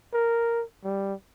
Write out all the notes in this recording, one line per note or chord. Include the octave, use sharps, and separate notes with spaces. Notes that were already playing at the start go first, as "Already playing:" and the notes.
A#4
G3